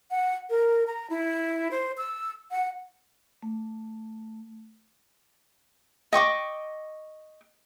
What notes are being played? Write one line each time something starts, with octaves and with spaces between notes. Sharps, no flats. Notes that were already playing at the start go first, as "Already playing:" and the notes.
F#5
A#4
A#5
E4
C5
E6
F#5
A3
D#5 G5 C#6 D6